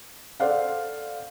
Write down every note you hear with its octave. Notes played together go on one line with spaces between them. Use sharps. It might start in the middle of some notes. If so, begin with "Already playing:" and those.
A4 C5 D5 F5 F#5